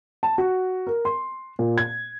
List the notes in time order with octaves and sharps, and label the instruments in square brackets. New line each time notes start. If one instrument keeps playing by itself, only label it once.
[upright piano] A5
F#4
A#4
C6
A#2
G#6